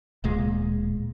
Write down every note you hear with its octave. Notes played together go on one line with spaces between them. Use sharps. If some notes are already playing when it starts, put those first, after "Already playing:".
D1 A#2 G#3